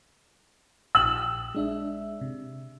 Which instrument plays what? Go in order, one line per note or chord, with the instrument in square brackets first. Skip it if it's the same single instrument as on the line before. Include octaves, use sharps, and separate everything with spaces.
[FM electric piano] A#1 G5 D#6 [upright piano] E6 F#7
[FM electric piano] G#3 D4 E5
C3